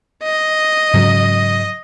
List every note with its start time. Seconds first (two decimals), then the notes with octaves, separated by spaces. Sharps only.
0.23 D#5
0.94 G#2 C#3 F#3